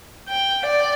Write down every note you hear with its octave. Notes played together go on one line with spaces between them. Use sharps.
G5
D5